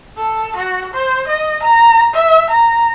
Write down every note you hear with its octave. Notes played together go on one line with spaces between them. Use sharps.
A4
F#4
C5
D#5
A#5
E5
A#5